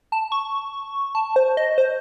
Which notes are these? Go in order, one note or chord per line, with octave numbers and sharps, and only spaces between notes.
A5
C#6
A5
C5
D#5
C5